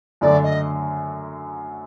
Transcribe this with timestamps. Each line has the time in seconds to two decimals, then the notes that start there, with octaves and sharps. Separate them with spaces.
0.21 F#2 D3 F#3 A3 D5
0.43 D#5